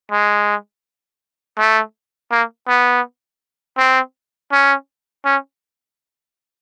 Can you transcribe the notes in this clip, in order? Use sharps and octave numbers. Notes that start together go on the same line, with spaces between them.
G#3
A3
A#3
B3
C4
C#4
C#4